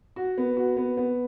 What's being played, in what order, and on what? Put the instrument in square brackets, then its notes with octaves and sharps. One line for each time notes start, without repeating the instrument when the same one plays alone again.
[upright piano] F#4
B3
F#4
B3
B3